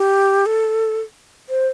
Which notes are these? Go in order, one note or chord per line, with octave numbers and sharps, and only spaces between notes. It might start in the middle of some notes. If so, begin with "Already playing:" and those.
Already playing: G4
A4
C5